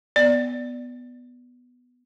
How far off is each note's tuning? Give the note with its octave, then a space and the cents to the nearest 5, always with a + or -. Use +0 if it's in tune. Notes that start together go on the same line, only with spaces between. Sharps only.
B3 +0 D5 +5